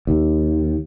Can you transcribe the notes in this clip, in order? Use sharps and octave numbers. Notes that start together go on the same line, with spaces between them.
D#2